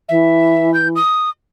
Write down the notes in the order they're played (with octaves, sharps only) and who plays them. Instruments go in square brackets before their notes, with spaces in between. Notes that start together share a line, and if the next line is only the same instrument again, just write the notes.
[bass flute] E3 [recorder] E5
[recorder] G6
D#6